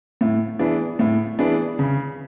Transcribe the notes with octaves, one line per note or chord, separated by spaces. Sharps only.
A2
E3 B3 D4 G#4
A2
E3 B3 D4 G#4
C#3